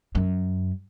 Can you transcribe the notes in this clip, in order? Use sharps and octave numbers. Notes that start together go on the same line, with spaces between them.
F#2